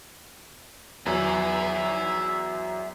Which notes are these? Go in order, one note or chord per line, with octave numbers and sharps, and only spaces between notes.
E2 F#3 E5 G#5